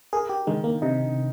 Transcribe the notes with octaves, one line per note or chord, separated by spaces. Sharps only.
G#4 A#4
G4
D#3 G#3
A#3
C3 D#4